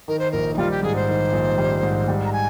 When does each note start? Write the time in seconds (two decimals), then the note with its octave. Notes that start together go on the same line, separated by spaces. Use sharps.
0.08 D#3 A#4
0.19 C5
0.31 A#1 A#4
0.54 D#4
0.58 G3 F4
0.71 G4
0.83 G#2 G#4
0.96 C5
1.08 D#3
1.33 A#1
1.58 G3
1.83 G#2
2.08 G3
2.26 A#5
2.33 G#5